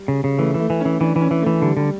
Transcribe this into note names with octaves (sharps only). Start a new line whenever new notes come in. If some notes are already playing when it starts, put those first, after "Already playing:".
Already playing: G3
C#3
C#3
E3 A3
E3 A3
E3
C#4
E3
E3 D4
E3 C#4
E3
E3 A3
D3 G3
D3 G3